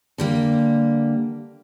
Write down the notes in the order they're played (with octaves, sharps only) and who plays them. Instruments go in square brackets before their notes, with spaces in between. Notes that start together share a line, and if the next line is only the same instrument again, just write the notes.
[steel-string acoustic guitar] D3 G3 A#3